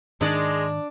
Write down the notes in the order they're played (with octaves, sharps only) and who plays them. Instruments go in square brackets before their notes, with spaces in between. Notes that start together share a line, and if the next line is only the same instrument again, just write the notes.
[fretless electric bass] G#2 D#3 [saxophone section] G#3 [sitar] D4 D5